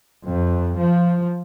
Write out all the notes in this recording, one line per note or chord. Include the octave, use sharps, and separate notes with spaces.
F2
F3